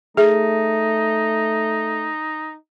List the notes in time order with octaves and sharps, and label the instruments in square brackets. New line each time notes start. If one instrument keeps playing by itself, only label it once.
[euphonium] A3 [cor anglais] D#4 [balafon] G#4 E5